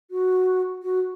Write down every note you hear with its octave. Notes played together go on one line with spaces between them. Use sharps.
F#4
F#4